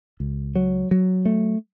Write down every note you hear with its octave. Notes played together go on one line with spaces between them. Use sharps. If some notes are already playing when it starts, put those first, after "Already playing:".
C#2
F#3
F#3
A3